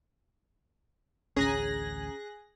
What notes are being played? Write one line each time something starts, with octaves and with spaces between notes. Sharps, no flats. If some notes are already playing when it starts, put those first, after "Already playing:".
A1 D2 C#4 G#4 A#5 F#6 A#6